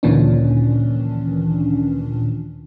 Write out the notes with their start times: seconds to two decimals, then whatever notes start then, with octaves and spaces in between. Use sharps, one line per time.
0.03 D2 A#2 D#3 E3 C#4 D4